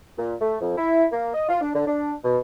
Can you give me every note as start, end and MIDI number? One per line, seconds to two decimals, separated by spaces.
0.17 0.33 46
0.41 0.56 57
0.61 0.76 41
0.77 1.05 64
1.12 1.32 58
1.34 1.45 75
1.49 1.59 65
1.61 1.72 62
1.75 1.86 50
1.87 2.14 62
2.24 2.38 47